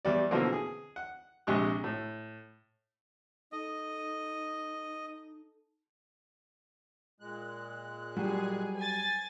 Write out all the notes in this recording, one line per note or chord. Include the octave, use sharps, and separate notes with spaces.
E2 G3 D5
B2 D3 E3 F3 A#3 C4
G#4
F#5
A#1 C3 G#3 G4 C#6 F#6
A2
D#4 A4 D#5
A#2 G#3 F#6
F#3 G3 G#4
G#5 A6